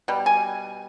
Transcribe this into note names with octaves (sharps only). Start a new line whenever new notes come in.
B2 G3
G#5